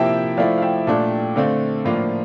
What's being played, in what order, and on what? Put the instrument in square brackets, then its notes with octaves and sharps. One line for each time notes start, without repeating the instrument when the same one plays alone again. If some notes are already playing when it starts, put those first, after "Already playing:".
Already playing: [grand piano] C3 F3 A#3 E4 [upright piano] E5 G5 A5
[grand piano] F3 A3 E4 [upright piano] D5 F5
[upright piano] F5
E5 G5
[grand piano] A#2 A3 D4 [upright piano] F5 A5
[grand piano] D3 A3 C4 [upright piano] D5 F5
[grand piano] A2 F3 A#3 D4 F4